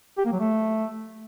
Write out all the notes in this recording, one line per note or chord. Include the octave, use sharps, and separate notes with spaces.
G4
A#3
F#3
A3